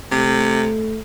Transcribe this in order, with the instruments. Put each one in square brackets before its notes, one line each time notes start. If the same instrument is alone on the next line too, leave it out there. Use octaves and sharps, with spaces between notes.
[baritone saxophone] C3 [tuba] A3